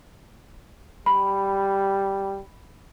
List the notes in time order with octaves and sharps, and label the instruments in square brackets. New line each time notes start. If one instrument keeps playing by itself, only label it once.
[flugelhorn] G3 [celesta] B5